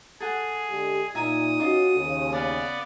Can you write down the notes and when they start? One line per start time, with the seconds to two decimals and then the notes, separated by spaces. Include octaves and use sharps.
0.20 G#4 A4 F#5
0.70 D3 G#3 G4
1.15 A#2 D#4 E5 G#5 A#5 D#6
1.60 C#4 F4 F#4 D#5 D6
1.96 D#2 C#3
2.32 B3 D5 F5